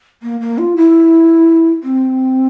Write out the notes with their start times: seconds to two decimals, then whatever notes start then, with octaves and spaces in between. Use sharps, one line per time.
0.22 A#3
0.40 A#3
0.58 F4
0.76 E4
1.83 C4